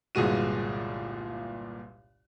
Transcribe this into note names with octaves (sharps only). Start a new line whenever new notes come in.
G1 C2 A#2 G#3 F#4 D#7